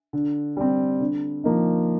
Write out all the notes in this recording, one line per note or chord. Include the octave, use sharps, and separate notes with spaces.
D3
G3 C4
D3
F3 A#3 D#4